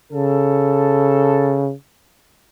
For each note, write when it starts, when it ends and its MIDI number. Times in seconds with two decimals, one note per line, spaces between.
0.13 1.73 49
0.13 1.66 69